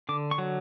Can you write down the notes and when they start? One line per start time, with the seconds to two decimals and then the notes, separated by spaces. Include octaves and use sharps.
0.09 D3 D6
0.31 C#6
0.38 F#3